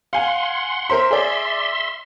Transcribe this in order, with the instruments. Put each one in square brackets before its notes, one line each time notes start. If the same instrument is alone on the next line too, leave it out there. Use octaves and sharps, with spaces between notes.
[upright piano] F5 G#5 [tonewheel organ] F#5 C6
[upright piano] A#4 C5 C6 [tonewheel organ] E5
[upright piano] G#4 D5 [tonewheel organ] E5 C6